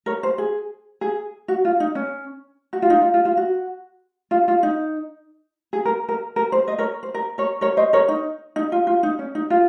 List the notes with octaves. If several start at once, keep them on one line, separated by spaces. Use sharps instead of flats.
A#4 C#5
C5
G#4
G#4
F#4
F4
D#4
C#4
F#4
F4
D#4
F4
F4
F4
F#4
F4
F4
D#4
G#4
A#4
A#4
A#4
C5
C5 D#5
A#4 C#5
C5
A#4
A#4 C#5
A#4 C#5
C5 D#5
A#4 C#5
D#4
D#4
F4
F4
D#4
C#4
D#4
F4